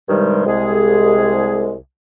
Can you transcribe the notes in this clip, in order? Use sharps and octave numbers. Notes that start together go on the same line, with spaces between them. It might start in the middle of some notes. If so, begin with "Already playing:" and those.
G2 C3 D#3 G3 G#3
C2 G#3 G#4